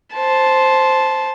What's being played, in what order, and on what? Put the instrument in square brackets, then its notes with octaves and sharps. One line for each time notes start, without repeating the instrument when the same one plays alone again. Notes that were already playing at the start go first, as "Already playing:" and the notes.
[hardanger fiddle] C5 A5